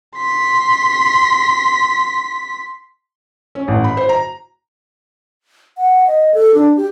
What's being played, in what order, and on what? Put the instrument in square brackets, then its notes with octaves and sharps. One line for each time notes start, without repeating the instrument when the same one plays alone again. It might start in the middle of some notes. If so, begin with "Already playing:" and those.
[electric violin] C6 B6
[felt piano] C#4
A1
B5
C5
A#5
[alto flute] F#5
D#5
A4
D4
G4